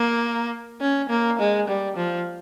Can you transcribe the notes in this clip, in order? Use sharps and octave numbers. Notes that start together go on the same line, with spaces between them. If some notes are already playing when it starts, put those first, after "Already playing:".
Already playing: A#3
C#4
A#3
G#3
G3
F3